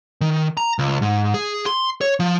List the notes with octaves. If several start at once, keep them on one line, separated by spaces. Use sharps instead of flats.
D#3
A#5
C#2
G#2
G#4
C6
C#5
F3